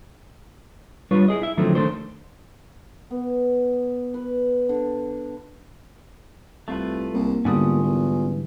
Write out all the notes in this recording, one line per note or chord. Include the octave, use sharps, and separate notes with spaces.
G3 D4 F4 B4 C#5
E4 G#4 D#5
E4 E5
D3 D#3 F3 F#3 A3 C4
D#3 A3 D4 C5
B3
B4
D3
C2 A3 F4 B4
C2 A#3
E2 G#2 D3 G3 C#4 F4 D#6
E2 E3